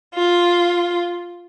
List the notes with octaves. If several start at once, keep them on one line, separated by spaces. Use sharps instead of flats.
F4